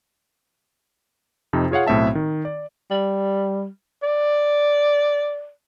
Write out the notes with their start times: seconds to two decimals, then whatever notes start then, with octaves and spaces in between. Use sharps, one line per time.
1.53 F2 C3 D#4
1.71 F4 G#4 C#5 F5 F#5
1.87 B1 A2 C4 E5 A5
2.15 D#3
2.45 D5
2.91 G3
4.03 D5